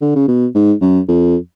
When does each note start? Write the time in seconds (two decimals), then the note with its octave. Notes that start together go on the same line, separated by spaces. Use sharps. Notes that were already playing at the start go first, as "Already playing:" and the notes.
0.02 D3
0.15 C#3
0.28 B2
0.55 G#2
0.81 F#2
1.08 F2